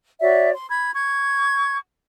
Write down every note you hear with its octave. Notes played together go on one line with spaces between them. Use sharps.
F#4 C#5 D5 E5
C6
B5 G#6
C#6 G#6